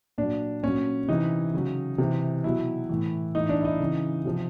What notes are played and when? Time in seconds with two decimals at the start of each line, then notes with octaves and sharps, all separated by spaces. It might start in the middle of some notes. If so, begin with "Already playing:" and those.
0.18 A#2 F#3 D4
0.63 A#2 F#3 C#4
1.08 C3 E3 D#4
1.54 C#3 F#3
1.98 C3 E3
2.44 B2 F#3 E4
2.89 A2 E3
3.35 A2 E3 D#4
3.49 D4
3.61 E4
3.65 D#4
3.80 C#3 E3
4.25 C3 F3